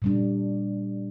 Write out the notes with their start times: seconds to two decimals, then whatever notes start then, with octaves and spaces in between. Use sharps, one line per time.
0.02 A#2 G3 D4